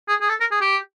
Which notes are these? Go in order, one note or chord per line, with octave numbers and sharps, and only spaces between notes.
G#4
G#4
A4
A#4
G#4
G4